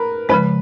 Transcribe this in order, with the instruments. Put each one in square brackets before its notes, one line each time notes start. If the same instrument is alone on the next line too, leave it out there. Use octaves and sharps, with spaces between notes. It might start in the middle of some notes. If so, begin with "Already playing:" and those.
Already playing: [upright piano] A#4 B4
[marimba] C#3 F3 G#3 [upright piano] B4